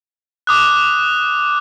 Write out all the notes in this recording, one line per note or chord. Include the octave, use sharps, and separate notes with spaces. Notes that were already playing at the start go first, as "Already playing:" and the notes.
D6 D#6 F#6